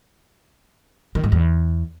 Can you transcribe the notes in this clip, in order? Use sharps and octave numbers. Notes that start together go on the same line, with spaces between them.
D#3
G#2
E2